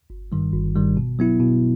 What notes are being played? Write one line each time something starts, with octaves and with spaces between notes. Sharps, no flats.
G1
G2 D#3 G3
G1
G2 D#3 G3
B2
F#3 B3 E4
B2